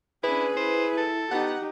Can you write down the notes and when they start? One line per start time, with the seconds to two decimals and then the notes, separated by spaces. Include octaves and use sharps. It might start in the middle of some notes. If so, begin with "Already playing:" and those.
0.24 C#4 D4 E4 G#4 B4
0.57 E4 C5
0.98 A4
1.31 B3 D#4 G4 F#5